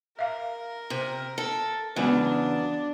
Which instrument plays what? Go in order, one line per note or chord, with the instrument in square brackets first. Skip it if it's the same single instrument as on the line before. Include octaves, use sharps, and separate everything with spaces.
[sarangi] A#4 [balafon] E5 F5
[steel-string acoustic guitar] C3
A4
[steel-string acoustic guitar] E2 C#3 F#3 [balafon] G#3 B3 [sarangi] D4